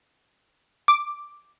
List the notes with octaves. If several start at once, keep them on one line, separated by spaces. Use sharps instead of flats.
D6